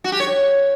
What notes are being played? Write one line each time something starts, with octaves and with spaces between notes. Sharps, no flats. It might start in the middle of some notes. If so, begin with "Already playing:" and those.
F#4
G4
C#5